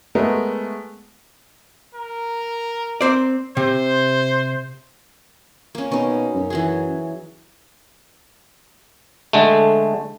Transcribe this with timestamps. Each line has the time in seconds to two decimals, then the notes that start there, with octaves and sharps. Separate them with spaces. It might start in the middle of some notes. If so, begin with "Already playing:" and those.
0.15 G#3 A3 B3 A#4
1.94 A#4
3.01 C4 C5 D5
3.57 C3 C5
5.75 A#3 C#4
5.92 B2 C#4 D#4
6.35 F#2
6.50 E3 F#3 G#4
9.33 D3 G#3 A3